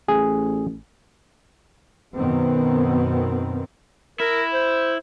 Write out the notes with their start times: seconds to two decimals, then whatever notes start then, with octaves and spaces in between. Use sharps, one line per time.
0.08 A1 G#4
2.15 F#2 B2 D#3 B3 C4
4.20 E4 A#4
4.53 C5